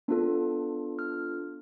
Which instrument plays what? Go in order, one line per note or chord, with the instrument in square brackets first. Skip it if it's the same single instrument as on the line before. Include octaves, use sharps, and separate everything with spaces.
[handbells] B3 D4 F4 A4
F6